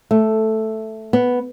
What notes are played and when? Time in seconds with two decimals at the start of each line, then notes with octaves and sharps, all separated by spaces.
0.11 A3
1.13 B3